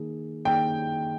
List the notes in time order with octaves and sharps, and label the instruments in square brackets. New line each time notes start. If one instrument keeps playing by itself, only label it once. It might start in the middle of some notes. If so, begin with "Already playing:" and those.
Already playing: [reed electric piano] D#3 A#3 D#4 G#4
[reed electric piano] D#3 A#3 D#4 G#4 [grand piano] G5